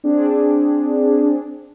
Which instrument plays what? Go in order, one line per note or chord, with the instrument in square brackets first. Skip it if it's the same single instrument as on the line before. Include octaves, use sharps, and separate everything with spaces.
[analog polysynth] C4 D4 G#4